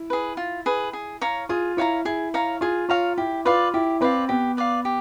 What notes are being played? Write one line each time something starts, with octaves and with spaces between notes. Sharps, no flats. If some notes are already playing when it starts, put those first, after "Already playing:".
Already playing: E4
G#4 B4
F4
G#4 B4
G#4
C#5 F5 A#5
F4 G#4
E4 C#5 F5 A#5
E4 G#4
C#5 F5 A#5
F4 G#4
F4 C#5 F5 A#5
E4 G4
F4 B4 D5 F5
E4 G4
C4 B4 D5 F5
B3 G4
B4 D5 F5
G4